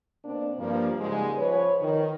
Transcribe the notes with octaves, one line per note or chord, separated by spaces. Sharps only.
B2 A#3 C4 D4
G2 F3 A#3
G#2 C#3 G3 G#3
F3 B4 C#5
D#3